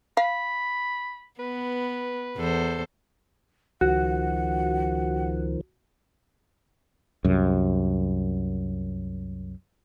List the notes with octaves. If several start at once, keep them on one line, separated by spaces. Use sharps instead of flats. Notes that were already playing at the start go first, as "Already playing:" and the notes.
F5 B5
B3 B4
E2 A4 C5
C#2 D#3 F3 F#4 F#5
C2 F#2